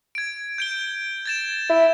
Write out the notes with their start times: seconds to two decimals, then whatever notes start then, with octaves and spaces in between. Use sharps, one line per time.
0.15 G#6 D7
0.58 G6 D7 G7
1.25 G#6 A6 E7
1.70 E4